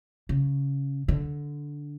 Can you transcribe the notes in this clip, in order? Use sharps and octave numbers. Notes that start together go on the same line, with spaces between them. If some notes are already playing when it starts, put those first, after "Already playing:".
C#3
D3